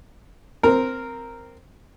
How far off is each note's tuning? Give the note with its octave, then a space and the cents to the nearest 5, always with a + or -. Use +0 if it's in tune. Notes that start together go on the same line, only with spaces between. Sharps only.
C4 -5 A#4 +0